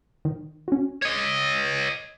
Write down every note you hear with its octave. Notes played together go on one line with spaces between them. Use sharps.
D#3
C#4 F#4
C#5 D#5